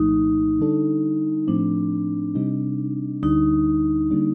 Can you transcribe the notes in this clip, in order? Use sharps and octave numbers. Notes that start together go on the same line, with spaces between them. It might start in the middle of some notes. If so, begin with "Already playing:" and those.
Already playing: C2 A#2 F3 A3 D#4
D3 G3 D4 A4
A2 F3 A3 C4 D4
C3 G3 C4 D#4
D2 D3 G3 D4 D#4
D3 G3 A#3 D4